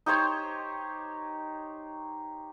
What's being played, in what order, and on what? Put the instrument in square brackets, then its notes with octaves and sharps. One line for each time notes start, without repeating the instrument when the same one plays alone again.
[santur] D#4 G4 C5 C#5